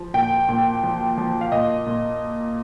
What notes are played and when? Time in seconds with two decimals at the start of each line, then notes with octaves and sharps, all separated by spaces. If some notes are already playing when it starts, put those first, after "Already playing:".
Already playing: F3
0.14 A#2 G5
0.49 A#2
0.83 F3
1.18 F3
1.41 F5
1.52 A#2 D#5
1.86 A#2